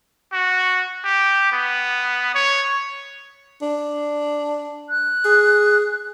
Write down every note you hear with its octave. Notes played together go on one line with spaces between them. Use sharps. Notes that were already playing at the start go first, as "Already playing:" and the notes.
F#4
G4
B3
C#5
D4
F#6
G#4